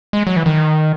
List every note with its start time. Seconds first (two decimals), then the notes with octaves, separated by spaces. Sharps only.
0.13 G#3
0.27 F#3
0.36 E3
0.46 D#3